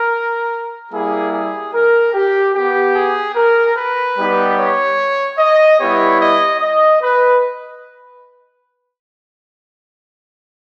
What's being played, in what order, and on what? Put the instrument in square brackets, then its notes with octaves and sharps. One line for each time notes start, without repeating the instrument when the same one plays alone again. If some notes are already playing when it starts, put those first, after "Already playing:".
Already playing: [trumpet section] A#4
G3 A#3 E4 G#4
G#4
A#4
G4
B3 G4
G#4
A#4
B4
G3 B3 D#4 G4
C#5
D#5
G3 B3 E4 G4 C#5
D#5
D#5
B4